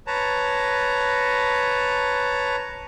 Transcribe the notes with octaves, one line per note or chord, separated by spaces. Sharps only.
B4 C#5 A5 A#5